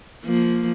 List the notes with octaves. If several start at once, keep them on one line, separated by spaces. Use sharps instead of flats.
F3 A#3